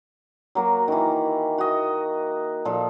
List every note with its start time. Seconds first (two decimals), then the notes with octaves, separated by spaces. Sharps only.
0.55 F#3 A#3 F#4
0.88 D#3 E3
1.58 F#4 D#5
2.65 A#2 F3 A4